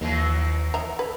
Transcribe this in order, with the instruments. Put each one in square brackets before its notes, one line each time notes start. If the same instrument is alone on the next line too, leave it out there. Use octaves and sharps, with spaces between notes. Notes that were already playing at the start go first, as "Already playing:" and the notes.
[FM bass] D#2 [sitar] D#3 E3 F#3
[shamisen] D#5 E5 A#5
B4